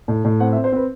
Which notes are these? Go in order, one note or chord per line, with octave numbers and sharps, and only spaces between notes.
A2
A2
C4 F#5
E5
C4
C5
C4 B4